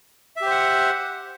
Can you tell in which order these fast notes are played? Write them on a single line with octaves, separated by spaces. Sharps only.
E5 G4 C5 F#5